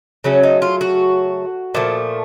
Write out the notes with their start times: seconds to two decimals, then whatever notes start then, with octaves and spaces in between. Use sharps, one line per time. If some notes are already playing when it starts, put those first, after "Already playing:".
0.24 C#3 F#3 A3 C#4
0.43 D#4
0.62 F4
0.81 F#4
1.75 A#2 F3 A3